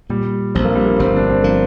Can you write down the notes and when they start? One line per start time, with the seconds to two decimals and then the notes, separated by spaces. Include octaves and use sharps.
0.10 A#2 G3
0.55 A#1 C4
0.65 A#3
0.75 G3
0.85 A#3
0.99 G1 C4
1.16 D4
1.30 C4
1.43 F3 A#3